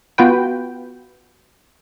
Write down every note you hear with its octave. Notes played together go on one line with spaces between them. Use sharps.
B3 F4 F#4 B4 G5